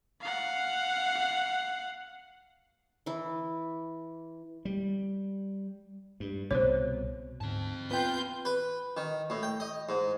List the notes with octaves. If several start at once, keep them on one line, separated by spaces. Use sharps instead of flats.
F5 F#5
E3 E4
G3
G2
C2 B2 C5 C#5
D2 G#2 C4 A5
B3 F4 B4 G5 G6
B4
D#3
A2
G5
D#5
G#2